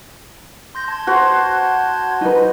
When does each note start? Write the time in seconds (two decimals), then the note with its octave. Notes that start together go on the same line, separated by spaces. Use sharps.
0.75 C6 G6 A#6
0.88 A5 C6 G#6
1.07 F#4 C5
2.21 D#4 B4